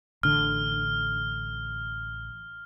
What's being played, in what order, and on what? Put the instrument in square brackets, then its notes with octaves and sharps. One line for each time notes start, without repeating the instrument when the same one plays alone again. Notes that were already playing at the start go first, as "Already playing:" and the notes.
[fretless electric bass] A1 D3 [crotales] F6